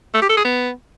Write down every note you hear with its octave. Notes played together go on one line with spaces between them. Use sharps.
A3
G4
A4
G#4
B3